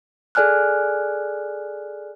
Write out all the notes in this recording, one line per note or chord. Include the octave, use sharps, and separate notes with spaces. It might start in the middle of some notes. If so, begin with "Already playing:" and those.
G#4 A4 D5 G#5 F6 F#6